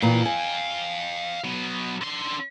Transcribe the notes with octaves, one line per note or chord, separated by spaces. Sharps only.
A#2 E3 F5 G5
G#5
F#3 B3
D3 C6